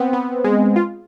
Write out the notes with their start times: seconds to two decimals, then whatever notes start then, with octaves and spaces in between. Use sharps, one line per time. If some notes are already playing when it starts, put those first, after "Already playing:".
Already playing: B3 C4
0.13 B3
0.44 G#3
0.76 F4